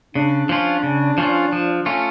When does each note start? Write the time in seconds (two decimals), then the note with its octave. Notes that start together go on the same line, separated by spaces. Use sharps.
0.15 C#3 D4
0.49 F3 C#4 F4
0.83 C#3
1.18 F3 C#4 F4
1.53 F3
1.86 A3 C#4 F4